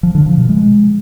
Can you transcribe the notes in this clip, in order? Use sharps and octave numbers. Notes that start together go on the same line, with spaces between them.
F3
D3
F3
B2
G#3